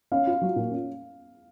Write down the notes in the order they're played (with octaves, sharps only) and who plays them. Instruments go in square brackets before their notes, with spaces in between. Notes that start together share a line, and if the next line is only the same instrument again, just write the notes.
[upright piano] C#4 [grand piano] F5
[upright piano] F4
F#3
A#2
C#4